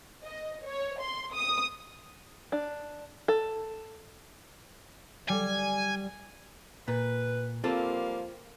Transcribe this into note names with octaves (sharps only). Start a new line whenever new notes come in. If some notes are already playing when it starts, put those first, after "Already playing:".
D#5
C#5
C6
D#6
D4
A4
G3 G#5
A#2 B4
F3 G3 A#3 C4 F4 A4